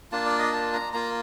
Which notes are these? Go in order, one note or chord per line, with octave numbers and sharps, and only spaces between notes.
A#3 D4 F4 A5
D5
D#5
A5
A#5
A#3 F4 A#5